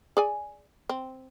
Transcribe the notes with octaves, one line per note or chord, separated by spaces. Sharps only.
G#4 D5 G#5
C4